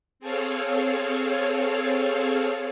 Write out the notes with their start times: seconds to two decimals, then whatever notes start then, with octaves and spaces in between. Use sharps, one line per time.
0.20 C4 G#4 A4 C#5 F5